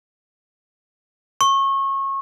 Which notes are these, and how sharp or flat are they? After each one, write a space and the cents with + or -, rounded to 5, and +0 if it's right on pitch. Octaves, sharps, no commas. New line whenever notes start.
C#6 -25